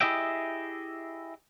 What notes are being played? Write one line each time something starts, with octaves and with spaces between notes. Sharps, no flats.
E4 G4 G#4 D#5 E5 G5